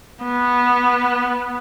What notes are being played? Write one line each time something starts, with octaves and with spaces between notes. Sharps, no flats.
B3